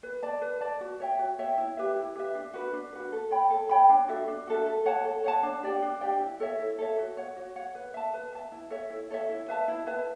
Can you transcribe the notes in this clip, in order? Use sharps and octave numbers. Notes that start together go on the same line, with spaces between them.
B4
D5 A5
B4
D5 A5
F#4
C#5 E5 G5
F#4
C#5 E5 G5
E4
G4 B4 E5
E4
G4 B4 E5
D4
F#4 B4
D4
F#4 B4
A4
C#5 G5 B5
A4
C#5 G5 B5
D4
F#4 A4 E5
D4
F#4 A4 E5
A4
C#5 F#5 A5
A4
C#5 F#5 A5
D4
G4 D5 G5
D4
G4 D5 G5
E4
A4 C#5 E5
E4
A4 C#5 E5
F#4
C#5 F#5
F#4
C#5 F#5
B4
E5 A5
B4
E5 A5
E4
A4 C#5 E5
E4
A4 C#5 E5
E4
B4 E5 A5
E4
B4 E5 A5